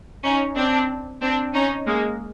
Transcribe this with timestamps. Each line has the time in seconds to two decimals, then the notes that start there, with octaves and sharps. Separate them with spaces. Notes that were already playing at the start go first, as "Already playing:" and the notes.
0.23 C#4 D#4
0.56 C4 D4
1.21 C4 D4
1.54 C#4 D#4
1.86 G#3 A#3